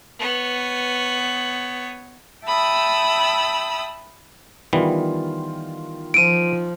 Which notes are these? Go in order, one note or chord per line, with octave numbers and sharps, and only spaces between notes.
B3 C#5
E5 G5 A5 B5 D#6 E6
D#3 E3 G3 B3 F4
F3 D7 D#7